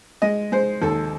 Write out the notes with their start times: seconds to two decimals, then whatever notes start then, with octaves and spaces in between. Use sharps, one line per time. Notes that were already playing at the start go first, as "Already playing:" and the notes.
0.22 G#3 D#5
0.52 G#3 C5
0.82 D#2 A4